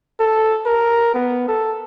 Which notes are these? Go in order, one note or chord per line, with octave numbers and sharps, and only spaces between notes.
A4
A#4
B3
A4